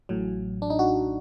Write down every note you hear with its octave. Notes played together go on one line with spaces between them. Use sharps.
A1 A2 F#3
D4
D#4
F#4